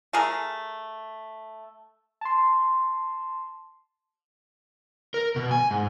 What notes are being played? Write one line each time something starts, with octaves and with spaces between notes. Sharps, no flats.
A3 G#4 A#4
A5 C6
A#4
B2
G#5
G#2